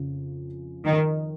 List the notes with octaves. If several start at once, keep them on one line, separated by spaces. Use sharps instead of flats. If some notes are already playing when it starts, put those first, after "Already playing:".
Already playing: F2 C#3 F3 C#4 F4
D#3